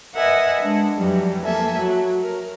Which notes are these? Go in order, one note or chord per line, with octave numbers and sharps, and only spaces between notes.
A#4 B4 D#5 E5 F#5 G#5
G#3 D4
F2 E3 F#3 G3
A#3 A4 E5 G#5
F#3
A#4